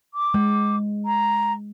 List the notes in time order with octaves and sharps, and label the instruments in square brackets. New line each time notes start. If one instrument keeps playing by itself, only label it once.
[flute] D6
[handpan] G#3
[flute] A#5